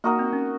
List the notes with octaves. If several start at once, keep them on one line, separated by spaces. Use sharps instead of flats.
A#3 D#4 F#4 A#4 D#5
C4
C#4